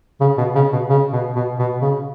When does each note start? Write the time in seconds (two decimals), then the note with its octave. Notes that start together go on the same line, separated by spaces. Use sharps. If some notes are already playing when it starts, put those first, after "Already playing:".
0.21 C#3
0.38 B2
0.55 C#3
0.72 B2
0.89 C#3
1.13 B2
1.36 B2
1.59 B2
1.82 C#3